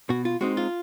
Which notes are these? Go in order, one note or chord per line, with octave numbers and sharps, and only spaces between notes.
B2 F#4
F4
G#3 C4 D#4 F#4
F4